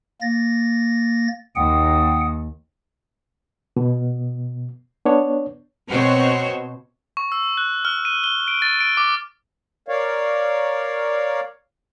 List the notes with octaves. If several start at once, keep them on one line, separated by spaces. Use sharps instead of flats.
A#3 A6 A#6
D#2 F#5 G5 D#6
B2
B3 D4 C#5
B2 C4 F#4 C5 C#5
C#6
E6
F#6
F6
D#7
G7
D7
A6
D7
D6
A#4 C#5 D5 F5